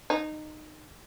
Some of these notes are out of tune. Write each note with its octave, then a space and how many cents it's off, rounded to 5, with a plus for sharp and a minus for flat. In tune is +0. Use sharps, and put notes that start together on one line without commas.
D#4 -20